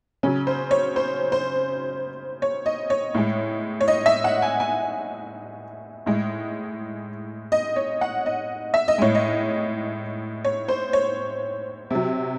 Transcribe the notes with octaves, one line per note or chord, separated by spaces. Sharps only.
C#3 F#3 C#4
C5
C#5
C5
C5
C#5
D#5
C#5
A2 G#3
C#5
D#5
E5
F#5
G#5
G#5
A2 G#3
D#5
C#5
F#5
D#5
E5
D#5
A2 G#3 C#5
D#5
C#5
C5
C#5
C3 F#3